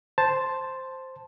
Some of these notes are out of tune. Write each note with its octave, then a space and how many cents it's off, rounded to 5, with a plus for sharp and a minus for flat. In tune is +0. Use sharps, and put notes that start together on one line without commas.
C5 +0 A5 +0